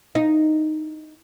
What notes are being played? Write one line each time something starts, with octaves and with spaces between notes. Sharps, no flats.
D#4